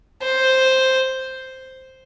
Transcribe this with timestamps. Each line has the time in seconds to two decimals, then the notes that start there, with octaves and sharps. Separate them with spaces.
0.22 C5